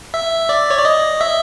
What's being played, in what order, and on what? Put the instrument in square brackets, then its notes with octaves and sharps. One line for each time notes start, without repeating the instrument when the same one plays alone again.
[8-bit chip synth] E5
D5
C#5
D5
D#5
E5